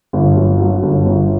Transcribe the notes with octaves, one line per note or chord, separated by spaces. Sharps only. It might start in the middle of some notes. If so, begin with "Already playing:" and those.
G1
F#2
F#3
G1
G1